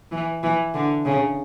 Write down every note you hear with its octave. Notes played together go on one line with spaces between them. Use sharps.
E3
E3
D3
C#3